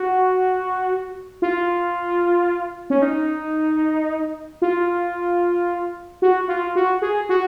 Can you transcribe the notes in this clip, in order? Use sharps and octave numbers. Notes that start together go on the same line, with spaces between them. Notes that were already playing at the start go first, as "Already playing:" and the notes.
Already playing: F#4
F4
C#4
D#4
F4
F#4
F4
F#4
G#4
F#4